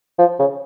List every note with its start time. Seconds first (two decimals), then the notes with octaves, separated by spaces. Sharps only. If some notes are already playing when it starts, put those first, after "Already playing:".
0.19 F3
0.39 C#3